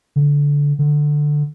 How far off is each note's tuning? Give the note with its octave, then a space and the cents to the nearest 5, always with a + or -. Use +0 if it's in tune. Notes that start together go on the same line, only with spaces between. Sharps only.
D3 -20
D3 +10